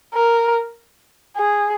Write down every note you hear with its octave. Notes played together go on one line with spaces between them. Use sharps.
A#4
G#4